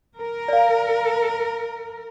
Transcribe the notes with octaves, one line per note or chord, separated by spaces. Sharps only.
A#4
D5 F5